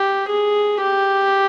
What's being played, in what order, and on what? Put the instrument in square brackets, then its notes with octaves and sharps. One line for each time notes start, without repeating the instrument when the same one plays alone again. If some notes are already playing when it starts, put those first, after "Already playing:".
Already playing: [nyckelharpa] G4
G#4
G4